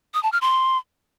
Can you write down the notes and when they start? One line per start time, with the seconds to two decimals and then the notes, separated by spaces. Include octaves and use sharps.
0.14 D#6
0.23 A5
0.32 F6
0.41 C6